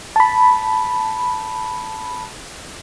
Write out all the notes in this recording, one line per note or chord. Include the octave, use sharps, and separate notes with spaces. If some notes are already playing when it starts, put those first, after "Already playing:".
A5 B5